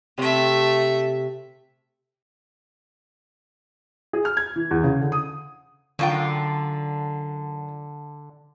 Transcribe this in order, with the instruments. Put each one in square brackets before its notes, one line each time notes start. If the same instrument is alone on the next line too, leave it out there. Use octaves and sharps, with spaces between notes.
[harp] C3 [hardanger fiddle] A3 E5
[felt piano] G#4
F6
G#6
E3
E2
C#3
D3
D#6
[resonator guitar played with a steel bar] F#2 F4 G5 [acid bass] D3